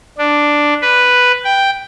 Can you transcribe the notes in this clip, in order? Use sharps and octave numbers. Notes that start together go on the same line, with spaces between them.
D4
B4
G5